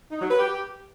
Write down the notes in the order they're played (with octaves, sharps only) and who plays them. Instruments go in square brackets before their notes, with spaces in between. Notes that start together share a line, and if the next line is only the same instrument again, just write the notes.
[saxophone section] D#4
F#3
B4
G4